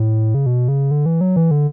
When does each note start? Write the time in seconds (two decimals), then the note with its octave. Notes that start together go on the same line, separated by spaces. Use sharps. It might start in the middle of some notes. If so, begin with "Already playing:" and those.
Already playing: A2
0.35 C#3
0.46 B2
0.68 C#3
0.91 D3
1.06 E3
1.21 F#3
1.36 E3
1.51 D3